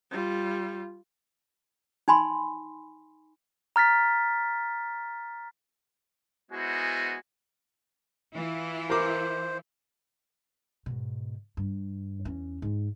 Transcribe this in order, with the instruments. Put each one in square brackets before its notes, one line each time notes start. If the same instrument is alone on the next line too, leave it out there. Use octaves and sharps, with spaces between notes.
[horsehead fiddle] G3 F4
[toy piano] D#4 G#5 B5 C6
[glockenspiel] A#5 F6 A6 B6
[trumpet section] G#3 B3 E4 F#4 C5 G#5
[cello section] E3 E4 F4
[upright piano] A#4 D6 [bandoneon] C5
[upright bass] G#2 B2
G2
E2 C#4
G#2 G#3